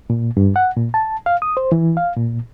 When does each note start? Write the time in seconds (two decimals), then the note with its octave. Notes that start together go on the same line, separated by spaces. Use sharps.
0.10 A#2
0.37 G2
0.56 F#5
0.77 A#2
0.94 A5
1.26 F5
1.42 D#6
1.57 C5
1.72 E3
1.97 F5
2.17 A#2